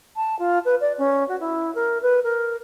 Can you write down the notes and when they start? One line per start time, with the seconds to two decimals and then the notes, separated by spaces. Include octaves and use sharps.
0.16 A5
0.38 F4
0.65 B4
0.80 D5
0.97 C#4
1.28 F#4
1.39 E4
1.74 A#4
2.01 B4
2.23 A#4